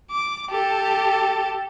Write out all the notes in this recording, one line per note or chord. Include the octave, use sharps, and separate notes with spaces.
D6
G4 A4